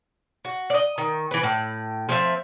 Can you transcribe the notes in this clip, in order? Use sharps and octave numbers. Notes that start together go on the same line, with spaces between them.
F#4
D5 D#5
D#3
E3 B4
A2
F3 C4 E5